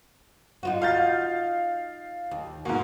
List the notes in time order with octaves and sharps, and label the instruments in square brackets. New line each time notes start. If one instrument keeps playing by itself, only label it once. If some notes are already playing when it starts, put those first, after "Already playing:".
[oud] D#4 F4 F#4
[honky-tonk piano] F5 G6 A6
[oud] D#2
[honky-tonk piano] G#2 B2 A#3 [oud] F#4